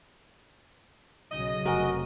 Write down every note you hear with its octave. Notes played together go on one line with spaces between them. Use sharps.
B1 C#3 F#3 D#5
F1 F#4 A#4 G#5